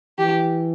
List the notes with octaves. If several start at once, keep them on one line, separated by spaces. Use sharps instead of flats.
E3 G4